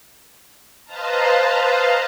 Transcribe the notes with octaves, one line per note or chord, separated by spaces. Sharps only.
B4 C5 D#5 F5 A5 A#5